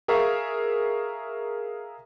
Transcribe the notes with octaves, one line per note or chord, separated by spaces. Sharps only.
G#4 A#4 E5 F5 A#5 C#6